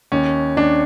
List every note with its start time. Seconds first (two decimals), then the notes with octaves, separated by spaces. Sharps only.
0.12 D#2 C#4
0.57 D#2 D4